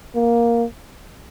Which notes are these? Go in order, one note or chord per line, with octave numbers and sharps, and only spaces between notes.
A#3